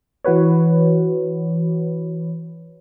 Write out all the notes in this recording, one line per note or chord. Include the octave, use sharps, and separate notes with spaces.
E3 F#4 B4 C#5